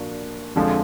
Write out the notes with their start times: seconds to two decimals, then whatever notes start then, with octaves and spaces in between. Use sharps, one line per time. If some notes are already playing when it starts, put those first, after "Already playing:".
Already playing: A#2 F3 A#3 D4 F#4
0.55 F2 D3 F3 G#3